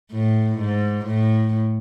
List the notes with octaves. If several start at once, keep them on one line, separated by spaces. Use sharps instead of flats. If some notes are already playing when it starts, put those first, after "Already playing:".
A2
G#2
A2